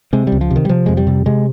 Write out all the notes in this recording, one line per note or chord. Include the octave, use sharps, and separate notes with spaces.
C3 G#3
G3
C#2
F3
C3
D#3
G3
C3 F3
F2 G#3
G3
C3
C3 G#3